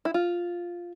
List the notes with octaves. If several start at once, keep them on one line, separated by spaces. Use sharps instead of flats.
E4
F4